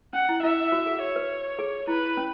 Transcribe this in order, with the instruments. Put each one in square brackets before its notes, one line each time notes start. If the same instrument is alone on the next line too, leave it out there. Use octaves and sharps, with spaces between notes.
[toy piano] C#4 [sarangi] F#5
[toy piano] E4
[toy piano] E4 [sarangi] E5
[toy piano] F#4
G#4
[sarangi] C#5
[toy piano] B4
G#4
[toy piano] E4 [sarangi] B4
[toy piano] C#4